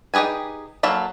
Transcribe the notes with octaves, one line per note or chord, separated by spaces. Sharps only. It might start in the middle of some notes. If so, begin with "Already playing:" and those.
D#4 G4 G#4 B4 G#5
F#3 A#3 A4 F5 B5